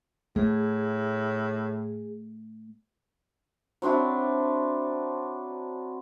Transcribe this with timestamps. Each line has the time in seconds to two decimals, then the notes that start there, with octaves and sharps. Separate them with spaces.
0.36 A2 A3 G#4
3.82 F#3 C4 D4 E4